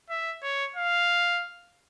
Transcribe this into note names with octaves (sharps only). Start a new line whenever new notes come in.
E5
C#5
F5